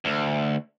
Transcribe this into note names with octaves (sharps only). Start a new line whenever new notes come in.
D2